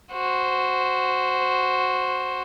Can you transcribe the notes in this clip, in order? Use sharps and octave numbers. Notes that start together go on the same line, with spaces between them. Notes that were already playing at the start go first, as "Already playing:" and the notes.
F#4 C5